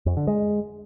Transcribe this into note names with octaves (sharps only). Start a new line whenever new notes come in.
F2
D3
G#3